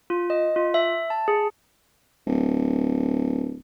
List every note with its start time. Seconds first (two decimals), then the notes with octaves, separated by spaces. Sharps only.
0.10 F4
0.30 D#5
0.56 F4
0.74 E5
1.10 A5
1.28 G#4
2.27 D1